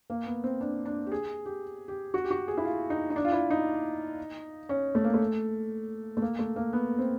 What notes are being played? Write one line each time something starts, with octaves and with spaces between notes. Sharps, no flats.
A#3
B3
C4
D4
D4
G4
G#4
G4
G4
F#4
G4
F#4
G#4
E4
F4
D#4
D#4
D4
F4
E4
D#4
C#4
A3
A#3
A3
A3
A#3
A3
A#3
B3
C4